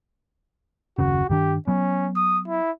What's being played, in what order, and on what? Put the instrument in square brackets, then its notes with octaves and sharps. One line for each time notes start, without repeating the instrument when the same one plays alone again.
[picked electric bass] F#1 D#2 C#3 [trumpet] F#4
[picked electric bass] G2 D#3 D4 [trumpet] G4
[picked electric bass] F#3 B3 [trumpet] C#4
[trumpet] D#6
E4